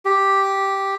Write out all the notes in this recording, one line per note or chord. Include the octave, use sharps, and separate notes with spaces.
G4